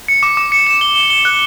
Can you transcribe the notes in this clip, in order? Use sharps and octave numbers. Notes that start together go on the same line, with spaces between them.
C#7
D6
D6
C#7
E7
G7
G7
G7
F#6